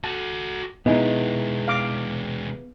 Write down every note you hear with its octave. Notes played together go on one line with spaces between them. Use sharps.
F#4 A4 A5
B2 G#3 B3 D#4 E4 G#4
F5 D6